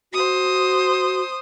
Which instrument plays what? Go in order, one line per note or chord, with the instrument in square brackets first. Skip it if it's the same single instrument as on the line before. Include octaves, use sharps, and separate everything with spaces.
[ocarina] F#4 [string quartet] C5 D#6